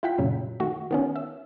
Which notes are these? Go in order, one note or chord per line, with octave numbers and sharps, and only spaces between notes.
E4 F4 F#5 G5 B6
F#2 A#2 C#3 F#3
D#3 A3 F#4
D#3 B3 C#4
E5